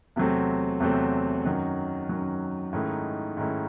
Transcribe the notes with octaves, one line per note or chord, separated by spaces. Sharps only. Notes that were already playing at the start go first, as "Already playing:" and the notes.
E2 C3 F#3 A3 C4
E2 C3 F#3 A3 C4
F#2 D#3 F#3
F#2 D#3 F#3
G#2 D#3 A3 C#4 E4
G#2 D#3 A3 C#4 E4